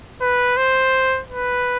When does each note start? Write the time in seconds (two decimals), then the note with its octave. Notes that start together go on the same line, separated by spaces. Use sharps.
0.21 B4
0.57 C5
1.29 B4